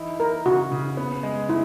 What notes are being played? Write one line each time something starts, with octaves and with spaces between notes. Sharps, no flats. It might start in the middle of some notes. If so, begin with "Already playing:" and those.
Already playing: E3 D#4 E4
E4 A#4
C#3 F#4
C#3
B3
G#3
G#3 E4